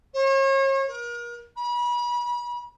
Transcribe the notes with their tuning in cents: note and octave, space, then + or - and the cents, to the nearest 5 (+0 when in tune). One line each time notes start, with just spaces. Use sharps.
C#5 -40
A#4 +35
B5 -35